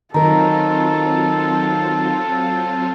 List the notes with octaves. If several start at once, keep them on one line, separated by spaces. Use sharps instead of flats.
D#3 F#3 C4 F4 A4 A#4 A#5